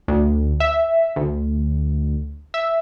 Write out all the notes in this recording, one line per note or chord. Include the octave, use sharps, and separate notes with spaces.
D2
E5
D2
E5